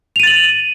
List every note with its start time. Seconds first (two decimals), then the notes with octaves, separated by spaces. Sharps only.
0.16 F7
0.20 D#7
0.23 A6
0.27 F#7